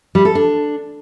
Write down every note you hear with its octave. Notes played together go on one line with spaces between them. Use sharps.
G3
A4
D4